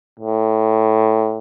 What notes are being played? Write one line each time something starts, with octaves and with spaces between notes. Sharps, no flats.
A2